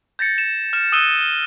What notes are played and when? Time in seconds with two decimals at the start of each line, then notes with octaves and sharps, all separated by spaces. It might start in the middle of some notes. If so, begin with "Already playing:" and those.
0.19 G6 A6 A#6 C#7
0.38 E7
0.73 F6 E7
0.92 D#6 E6 F#6 D#7 E7 G7
1.16 G7